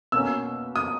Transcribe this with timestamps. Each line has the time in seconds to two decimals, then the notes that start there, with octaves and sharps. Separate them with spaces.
0.12 B2 A#3 C#4 E6
0.76 D#6